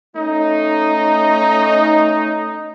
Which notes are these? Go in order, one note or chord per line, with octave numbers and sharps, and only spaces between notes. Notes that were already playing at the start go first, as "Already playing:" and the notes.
A3 C#4 D#4